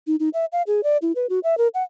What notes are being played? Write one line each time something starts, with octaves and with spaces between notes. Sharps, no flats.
D#4
D#4
E5
F5
G#4
D5
E4
B4
F#4
E5
A#4
F#5